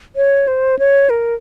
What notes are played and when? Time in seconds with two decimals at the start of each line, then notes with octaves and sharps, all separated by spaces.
0.16 C#5
0.48 C5
0.79 C#5
1.10 A#4